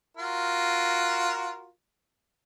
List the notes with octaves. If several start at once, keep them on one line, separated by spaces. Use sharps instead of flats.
F4 F#4 A#4